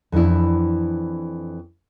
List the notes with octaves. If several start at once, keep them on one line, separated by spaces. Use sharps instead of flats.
F2 E3 D4 E4